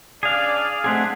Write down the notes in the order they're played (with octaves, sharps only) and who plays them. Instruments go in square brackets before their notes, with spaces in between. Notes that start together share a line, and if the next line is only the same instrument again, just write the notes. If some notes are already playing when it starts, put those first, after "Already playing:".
[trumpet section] C#4 D4 D5 [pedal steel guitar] G#4 F5
[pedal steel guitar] A3 C4 G#4 [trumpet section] D4 D#5 F#5